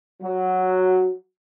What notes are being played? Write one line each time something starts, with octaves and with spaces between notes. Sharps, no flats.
F#3